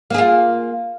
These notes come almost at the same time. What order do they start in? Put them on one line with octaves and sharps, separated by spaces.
A#3 G#4 F4